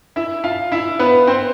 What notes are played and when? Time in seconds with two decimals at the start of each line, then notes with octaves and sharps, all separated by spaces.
0.16 E4 E5
0.44 F4 F5
0.72 E4 E5
0.99 B3 B4
1.27 C4 C5